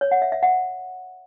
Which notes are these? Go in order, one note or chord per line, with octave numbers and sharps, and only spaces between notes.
C#5
F#5
E5
E5
F#5